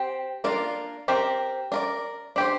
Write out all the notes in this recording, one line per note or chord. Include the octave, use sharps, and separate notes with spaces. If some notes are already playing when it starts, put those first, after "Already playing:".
Already playing: C4 G4 C5
A#3 D4 F4 A#4 D5
C4 G4 A#4
D4 A#4 D5
D4 G4 C5